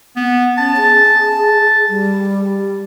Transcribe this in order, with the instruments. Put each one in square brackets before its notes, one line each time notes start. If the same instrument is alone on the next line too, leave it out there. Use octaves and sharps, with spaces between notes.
[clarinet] B3
[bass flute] C#4 [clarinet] A5
[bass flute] G#4
G3